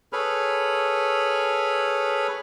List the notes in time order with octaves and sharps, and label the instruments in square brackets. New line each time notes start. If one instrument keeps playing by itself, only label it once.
[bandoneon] G#4 A4 B4 C#5 B5 F6